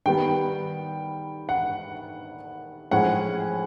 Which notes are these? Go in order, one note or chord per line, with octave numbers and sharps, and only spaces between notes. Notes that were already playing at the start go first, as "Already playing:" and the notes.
D#3 G3 B3 G5
F#5
A2 F3 G#3 C#4 F#5